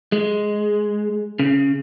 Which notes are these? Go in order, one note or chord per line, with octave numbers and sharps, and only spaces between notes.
G#3
C#3